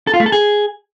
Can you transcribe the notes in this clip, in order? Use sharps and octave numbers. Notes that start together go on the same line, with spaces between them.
A4
F4
A3
A4
G#4